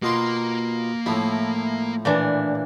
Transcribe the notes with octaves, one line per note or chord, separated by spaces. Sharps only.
B2 A#3 F4 C6
A2 F3 E4
A#2 E3 D4